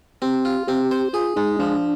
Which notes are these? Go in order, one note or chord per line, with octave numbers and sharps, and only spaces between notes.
C4 G4
F4
C4 G4
C5
F4 G#4
G#3 D#4
F3 D4